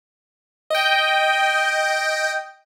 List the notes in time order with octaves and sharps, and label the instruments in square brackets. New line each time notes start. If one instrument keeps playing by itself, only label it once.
[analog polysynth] D#5 G5